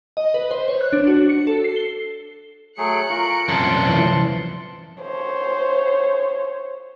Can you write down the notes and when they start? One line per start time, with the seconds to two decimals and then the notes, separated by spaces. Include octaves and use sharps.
0.17 D#5
0.34 B4
0.51 C5
0.68 C#5
0.81 F#6
0.93 D4
1.07 F#4
1.29 C#7
1.47 A4
1.64 C7
1.76 G7
2.78 F#3 A3 G#4 F#6 C#7 D7
3.10 F4 A#4 C#6
3.49 C2 F#2 A5 C6
3.87 E3 F3
5.01 C5 C#5